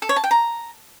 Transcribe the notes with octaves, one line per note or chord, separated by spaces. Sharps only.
A4
C#5
A5
G5
A#5